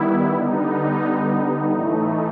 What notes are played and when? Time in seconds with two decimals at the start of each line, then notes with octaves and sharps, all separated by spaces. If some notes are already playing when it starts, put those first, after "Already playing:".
Already playing: D#3 G3 B3 E4
0.36 D3 G3 B3 D#4
1.73 A2 E3 A3